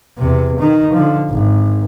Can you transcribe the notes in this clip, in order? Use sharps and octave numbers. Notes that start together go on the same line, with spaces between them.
E2 C3
D#3 D#4
D3 F3
G#1